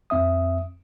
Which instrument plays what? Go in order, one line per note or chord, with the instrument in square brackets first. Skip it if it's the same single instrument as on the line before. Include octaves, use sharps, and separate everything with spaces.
[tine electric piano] F2 C4 E5 D#6